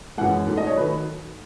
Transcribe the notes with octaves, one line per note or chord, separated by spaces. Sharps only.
F#2 E3 G#3 F#5
G#2 F#3 A3
D#5
C#5
D#3 F#3 A3 B4